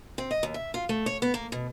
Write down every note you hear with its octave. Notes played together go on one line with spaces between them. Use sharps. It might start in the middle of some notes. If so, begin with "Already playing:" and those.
C4
D#5
D#2
E5
F4
A3
C#5
B3
A#3
B2